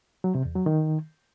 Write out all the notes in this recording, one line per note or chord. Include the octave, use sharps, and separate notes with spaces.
F#3
C3
E2
F#3
D#3